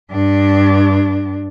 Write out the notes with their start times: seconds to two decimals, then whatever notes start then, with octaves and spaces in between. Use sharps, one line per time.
0.11 G2 D4